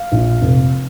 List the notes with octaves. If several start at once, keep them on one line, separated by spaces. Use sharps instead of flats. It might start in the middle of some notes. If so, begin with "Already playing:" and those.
Already playing: F5
A#1
F1